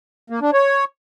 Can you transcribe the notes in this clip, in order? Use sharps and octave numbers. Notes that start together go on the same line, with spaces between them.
A#3
D4
C#5